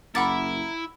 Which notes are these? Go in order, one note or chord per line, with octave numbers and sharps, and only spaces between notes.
F#1 E4 A#4 F#5 B5 D6 A6